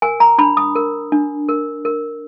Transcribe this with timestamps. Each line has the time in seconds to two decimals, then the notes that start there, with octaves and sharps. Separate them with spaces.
0.02 A#4 G#5
0.20 A#5
0.38 D4 B5
0.57 D#6
0.75 A#4
1.12 D4
1.49 A#4
1.85 A#4